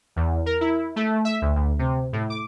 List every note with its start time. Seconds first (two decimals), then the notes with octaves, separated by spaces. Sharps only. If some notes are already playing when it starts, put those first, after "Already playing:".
0.16 E2
0.46 A#4
0.61 E4
0.96 A3
1.25 E5
1.42 D2
1.56 D2
1.79 C3
2.13 A2
2.30 D6